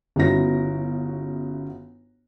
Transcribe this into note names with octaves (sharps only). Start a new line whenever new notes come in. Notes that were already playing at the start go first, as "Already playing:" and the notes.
G1 C#3 B3 E4 F#4 A#6